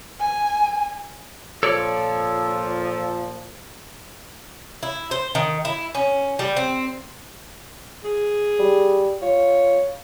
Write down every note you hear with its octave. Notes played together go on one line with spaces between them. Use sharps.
G#5
A#2 F3 A4 C#5 D5
E4
C5
D#3
E4
C#4
G3
C4
G#4
G3
F4 C#5